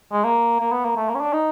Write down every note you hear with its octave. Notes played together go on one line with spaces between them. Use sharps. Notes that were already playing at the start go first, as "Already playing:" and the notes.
G#3
A#3
A#3
B3
A#3
A3
A#3
C#4
D4
D#4